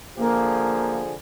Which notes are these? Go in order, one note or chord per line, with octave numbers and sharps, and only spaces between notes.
D3 F3 A#3 G#4